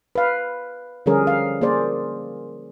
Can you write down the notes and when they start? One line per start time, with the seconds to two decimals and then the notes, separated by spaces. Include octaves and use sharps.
0.15 B4 F5
1.06 D3 F3 G3 C#4 G#4 A#4
1.27 F5
1.61 A#3 G#4 C5 D5